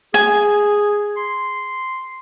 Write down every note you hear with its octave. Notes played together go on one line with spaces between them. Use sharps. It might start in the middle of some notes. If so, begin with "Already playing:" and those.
G#4 G#5
C6